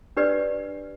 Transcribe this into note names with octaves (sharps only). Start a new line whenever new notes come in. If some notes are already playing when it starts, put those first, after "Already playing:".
D4 G4 B4 D5